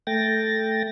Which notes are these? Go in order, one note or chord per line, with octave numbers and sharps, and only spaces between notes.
A3 G5 A6 A#6